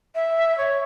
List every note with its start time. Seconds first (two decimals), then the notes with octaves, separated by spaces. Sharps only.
0.15 E5
0.58 C#5